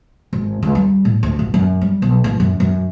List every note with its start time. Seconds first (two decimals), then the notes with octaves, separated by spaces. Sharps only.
0.33 G#1
0.62 C#2
0.75 G3
1.05 A2
1.23 D2
1.39 A1
1.54 F#2
1.81 G3
2.02 B1
2.24 A1
2.40 F#2
2.60 F#2